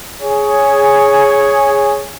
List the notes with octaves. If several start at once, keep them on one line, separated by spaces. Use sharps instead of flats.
G#4 C#5